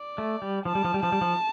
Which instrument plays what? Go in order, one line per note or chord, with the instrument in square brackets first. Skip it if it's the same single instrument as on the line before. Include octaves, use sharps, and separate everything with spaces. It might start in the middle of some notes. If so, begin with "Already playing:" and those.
Already playing: [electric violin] D5
[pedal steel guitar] A3
G3
[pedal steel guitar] F3 [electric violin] A5
[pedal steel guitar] G3
F3
G3
[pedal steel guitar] F3 [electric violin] A5
[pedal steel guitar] G3
F3